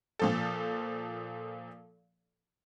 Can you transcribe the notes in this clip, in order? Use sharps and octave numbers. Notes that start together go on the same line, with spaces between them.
A#2 F3 A4